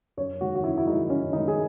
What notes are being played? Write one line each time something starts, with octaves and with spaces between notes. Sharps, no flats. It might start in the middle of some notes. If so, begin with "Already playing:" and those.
F#2 C#5
D#3 G#3 F#4
F#4
F#2 E4
E4
D#3 G#3 D#4
F#2 C#4
D#3 G#3 D#4
G#4